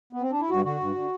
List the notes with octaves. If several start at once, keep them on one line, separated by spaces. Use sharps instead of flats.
B3
C4
D4
E4
G2 F#4
D3 F#4
G2
D3